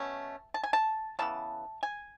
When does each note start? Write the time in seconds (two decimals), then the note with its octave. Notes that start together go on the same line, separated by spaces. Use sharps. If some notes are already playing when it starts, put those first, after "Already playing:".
Already playing: B2 A3 C#4 A5
0.54 A5
0.63 G#5
0.73 A5
1.19 C#3 E3 B3 A5
1.83 G#5